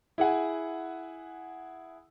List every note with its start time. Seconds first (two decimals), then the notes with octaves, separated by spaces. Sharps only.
0.18 E4 G#4 F#5 G#5